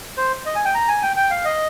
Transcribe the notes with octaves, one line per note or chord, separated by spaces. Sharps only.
C5
D#5
G#5
G5
A#5
G#5
G5
G5
F5
D#5